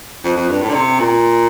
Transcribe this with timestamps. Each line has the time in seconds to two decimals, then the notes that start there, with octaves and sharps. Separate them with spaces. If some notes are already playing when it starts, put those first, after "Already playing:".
0.24 F2
0.36 F2
0.49 G2
0.61 A2
0.69 D3
0.74 C3
0.99 A#2